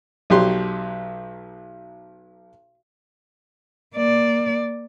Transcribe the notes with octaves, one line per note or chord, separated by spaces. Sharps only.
B1 F#3 G4 C6
A#3 D5